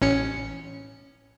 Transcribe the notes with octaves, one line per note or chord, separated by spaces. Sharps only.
A1 C#4 C#7